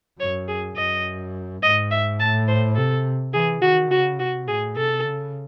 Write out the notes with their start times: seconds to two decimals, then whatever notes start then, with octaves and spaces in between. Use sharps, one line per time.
0.20 F#2 C#5
0.48 G#4
0.77 F#2 D#5
1.63 G#2 D#5
1.91 E5
2.20 A2 A5
2.48 C5
2.76 C3 A4
3.33 E3 G#4
3.62 D#3 F#4
3.90 C#3 F#4
4.19 C3 F#4
4.47 A2 G#4
4.76 C3 A4
5.04 C#3